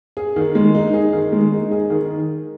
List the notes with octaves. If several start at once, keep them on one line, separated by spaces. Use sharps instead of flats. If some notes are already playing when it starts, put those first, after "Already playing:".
G#4
D#3
G#3
D#4
G#4
D#3
G#3
D#4
G#4
D#3